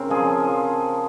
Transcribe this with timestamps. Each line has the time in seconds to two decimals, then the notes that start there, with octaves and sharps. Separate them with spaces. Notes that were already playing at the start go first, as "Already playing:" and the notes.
Already playing: C#3 C4 A#4
0.10 F3 F4 G#4
0.40 F3